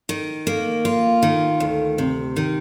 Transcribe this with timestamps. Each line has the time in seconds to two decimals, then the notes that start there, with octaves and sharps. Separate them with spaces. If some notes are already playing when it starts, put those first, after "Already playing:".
0.09 D#3
0.47 A#3
0.85 F4
1.23 D#3
1.60 D2
1.98 C3
2.36 D#3